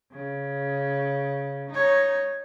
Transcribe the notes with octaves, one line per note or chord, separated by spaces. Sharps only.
C#3
D#4 C#5